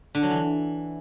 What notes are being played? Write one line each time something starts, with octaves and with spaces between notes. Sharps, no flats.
D3
F#3
E3